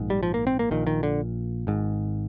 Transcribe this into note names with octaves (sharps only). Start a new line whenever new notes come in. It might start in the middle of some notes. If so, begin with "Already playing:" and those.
Already playing: A#1 G#2
G3
F3
A#3
C4
A#3
A#1 A#2 D#3
D#3
D3
G#1 G#2